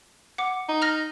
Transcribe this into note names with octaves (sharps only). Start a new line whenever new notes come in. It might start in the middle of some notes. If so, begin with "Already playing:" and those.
F#5 D6
D#4
A#5 F6 A#6